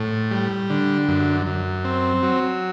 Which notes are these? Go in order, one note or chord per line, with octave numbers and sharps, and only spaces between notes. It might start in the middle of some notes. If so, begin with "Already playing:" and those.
Already playing: A2
G3
D3
F#2
F#2
C4
F#3